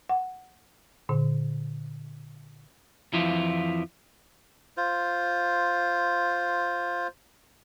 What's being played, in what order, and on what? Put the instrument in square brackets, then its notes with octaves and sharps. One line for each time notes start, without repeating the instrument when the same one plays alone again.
[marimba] F#5
A#2 D3
[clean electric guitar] F2 E3 F3 E4 F4
[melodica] F4 C5